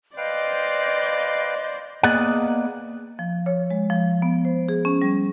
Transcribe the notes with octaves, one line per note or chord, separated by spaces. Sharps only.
B4 C5 D5 D#5 F5 G5
A#3 B3 G#4 D5 D#5 F#5
F3
C#5
G#3
F3
B3
C5
G#4
C#4
G3